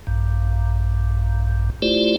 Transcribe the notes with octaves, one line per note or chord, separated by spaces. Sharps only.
A#1 G2
A3 E4 F4 G4 C5 D5